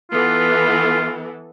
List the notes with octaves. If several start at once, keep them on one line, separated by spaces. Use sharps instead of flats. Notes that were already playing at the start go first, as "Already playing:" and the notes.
E3 B3 F4 A4